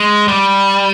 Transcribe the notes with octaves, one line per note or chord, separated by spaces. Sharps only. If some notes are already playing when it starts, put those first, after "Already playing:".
Already playing: G#3
G3